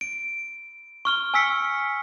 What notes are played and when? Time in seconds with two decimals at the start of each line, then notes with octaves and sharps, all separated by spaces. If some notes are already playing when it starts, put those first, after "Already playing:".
0.01 D7
1.05 C#6 F6 G7
1.34 G#5 E6 B6 C#7